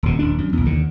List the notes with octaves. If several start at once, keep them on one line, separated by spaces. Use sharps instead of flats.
D#1 B2
D#1 D4
F#2
B1 E2
D#2 D3